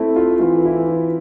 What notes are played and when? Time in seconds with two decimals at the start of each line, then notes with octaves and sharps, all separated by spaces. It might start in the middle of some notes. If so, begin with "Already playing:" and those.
Already playing: A3 C4 E4
0.16 F4
0.41 E3 F4
0.65 E4
0.88 F4